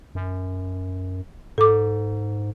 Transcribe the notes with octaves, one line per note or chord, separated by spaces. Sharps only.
F#2
G#2 A4 D6